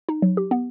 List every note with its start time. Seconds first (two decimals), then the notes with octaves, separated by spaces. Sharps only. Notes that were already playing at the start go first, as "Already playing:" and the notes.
0.09 D#4
0.22 F#3
0.37 G4
0.51 B3